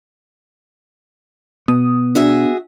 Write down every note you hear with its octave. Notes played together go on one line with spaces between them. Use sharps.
B2 B3 D#6
D4 F#4 G#4 E5